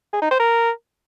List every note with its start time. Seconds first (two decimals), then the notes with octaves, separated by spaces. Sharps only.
0.13 G#4
0.22 D#4
0.31 C5
0.40 A#4